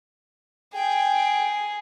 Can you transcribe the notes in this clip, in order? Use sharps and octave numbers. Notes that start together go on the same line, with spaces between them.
G#4 G5